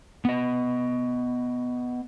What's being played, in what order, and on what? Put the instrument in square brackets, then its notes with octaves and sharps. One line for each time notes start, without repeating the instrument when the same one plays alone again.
[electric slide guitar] B3 D#5